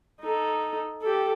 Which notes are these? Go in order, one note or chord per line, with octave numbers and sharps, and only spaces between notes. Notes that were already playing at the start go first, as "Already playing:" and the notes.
D#4 A4
G4 A4